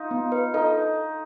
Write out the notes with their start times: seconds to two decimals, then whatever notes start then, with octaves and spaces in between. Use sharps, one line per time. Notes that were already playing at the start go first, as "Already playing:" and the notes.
Already playing: D#4 F4
0.11 B3
0.32 B4
0.54 D#4 A4